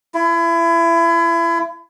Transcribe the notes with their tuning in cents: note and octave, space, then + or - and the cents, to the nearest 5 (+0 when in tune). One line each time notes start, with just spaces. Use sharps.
E4 +30